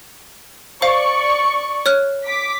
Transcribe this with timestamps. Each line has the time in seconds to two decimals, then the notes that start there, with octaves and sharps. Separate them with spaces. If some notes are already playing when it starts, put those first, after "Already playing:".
0.82 C5 D5 F5 C#6
1.86 C#5 F6 F#6
2.24 D6 B6